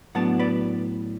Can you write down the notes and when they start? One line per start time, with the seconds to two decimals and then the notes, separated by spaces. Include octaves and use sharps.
0.15 A2 F#3 B3 D4 F#5 A5
0.39 B4 D5